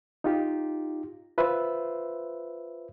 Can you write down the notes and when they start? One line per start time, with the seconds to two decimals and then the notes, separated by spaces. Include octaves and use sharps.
0.24 D#4 F4 G4
1.38 F4 B4 C5 E5